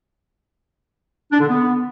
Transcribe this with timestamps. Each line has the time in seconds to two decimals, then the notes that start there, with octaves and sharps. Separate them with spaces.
1.32 D4
1.40 D3
1.48 B3